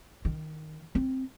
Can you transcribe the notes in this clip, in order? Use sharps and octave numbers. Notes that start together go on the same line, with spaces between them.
D#3
C4